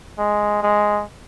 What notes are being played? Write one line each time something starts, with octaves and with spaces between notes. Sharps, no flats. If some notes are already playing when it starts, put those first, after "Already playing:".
G#3
G#3